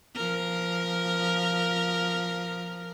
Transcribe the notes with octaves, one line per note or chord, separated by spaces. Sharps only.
F3 A#4